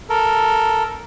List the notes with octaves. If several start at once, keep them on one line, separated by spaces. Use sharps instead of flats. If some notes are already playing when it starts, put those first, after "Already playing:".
A4 A#4